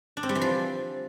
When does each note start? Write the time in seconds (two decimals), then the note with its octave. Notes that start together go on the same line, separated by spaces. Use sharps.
0.17 D4
0.23 C4
0.29 G3
0.35 E3
0.41 F3